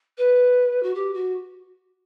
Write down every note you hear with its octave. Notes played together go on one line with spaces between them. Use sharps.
B4
F#4
G4
F#4